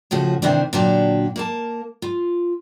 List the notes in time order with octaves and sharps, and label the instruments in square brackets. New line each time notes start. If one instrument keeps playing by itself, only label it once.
[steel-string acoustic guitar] A2 C#3 F3 F#4
C3 D#3 E3 C4 D4
A#2 D3 F#3 D4 F#4 G4
A#3 A#4 A5
F4